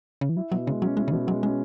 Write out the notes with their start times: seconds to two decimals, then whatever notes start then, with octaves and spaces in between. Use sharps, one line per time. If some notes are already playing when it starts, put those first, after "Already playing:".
0.21 C#3
0.29 E3
0.36 F#3 E4
0.52 B2 F#3
0.67 C#3 G#3
0.82 F#3 C#4
0.97 G#3 E4
1.08 C#3
1.12 B2 E3
1.27 F#3 G#3
1.43 G#3 C#4